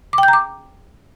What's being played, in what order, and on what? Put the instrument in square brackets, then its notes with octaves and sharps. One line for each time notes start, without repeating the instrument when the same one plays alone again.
[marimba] D6
G5
G6
A#5
D6